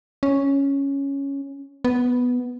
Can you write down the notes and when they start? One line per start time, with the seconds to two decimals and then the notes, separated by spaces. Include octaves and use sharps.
0.23 C#4
1.84 B3